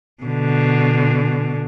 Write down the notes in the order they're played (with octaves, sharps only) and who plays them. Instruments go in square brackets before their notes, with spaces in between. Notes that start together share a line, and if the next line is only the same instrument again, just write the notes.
[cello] B2 D3